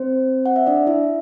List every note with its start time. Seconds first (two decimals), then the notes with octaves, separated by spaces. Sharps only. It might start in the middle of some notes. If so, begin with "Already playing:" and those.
Already playing: C4 C5
0.46 F#5
0.56 E5
0.66 D4 D5
0.87 E4 E5